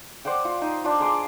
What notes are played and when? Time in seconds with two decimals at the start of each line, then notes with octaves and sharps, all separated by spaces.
0.25 C5 D5 F#5 G5
0.45 F4
0.62 D#4
0.84 D4 F4
1.00 G#4 A#5 C6 D6